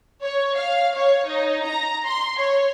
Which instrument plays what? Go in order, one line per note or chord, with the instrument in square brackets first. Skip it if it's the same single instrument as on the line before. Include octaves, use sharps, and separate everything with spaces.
[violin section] C#5
F5
C#5
D#4
A#5
C6
C#5